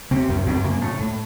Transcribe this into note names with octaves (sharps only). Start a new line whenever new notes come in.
C#3 C4
F#2
F#2 C4
C#3 A#3
A2 A3
A2